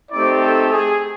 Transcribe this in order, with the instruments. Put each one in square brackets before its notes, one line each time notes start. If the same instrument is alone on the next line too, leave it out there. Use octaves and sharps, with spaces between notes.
[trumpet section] A3 C4 D#4 G4 D5
A4
G#4